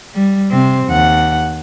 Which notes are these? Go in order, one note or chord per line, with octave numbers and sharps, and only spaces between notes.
G3
C3 C4
D#2 F#5